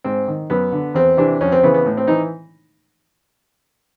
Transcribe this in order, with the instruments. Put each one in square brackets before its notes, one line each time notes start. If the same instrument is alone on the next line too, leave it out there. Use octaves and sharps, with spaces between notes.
[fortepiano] G#2 C4
D#3
F#2 B3
D3
E2 C4
C3 E3 D4
F2 C#4
C4
C#3 E3 B3
B3
A2
C4
E3 D#4